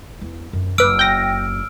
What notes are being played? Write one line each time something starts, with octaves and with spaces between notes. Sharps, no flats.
E2
F#2 F3
F#1 B4 D6 E6 F6 D7
G5 A#6